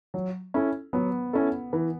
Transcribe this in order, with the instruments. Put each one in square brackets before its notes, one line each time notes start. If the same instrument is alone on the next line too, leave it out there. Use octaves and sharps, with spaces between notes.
[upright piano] F#3
C#4 E4 A4
[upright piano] F#3 [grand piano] B3
[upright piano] C#4 E4 A4
E3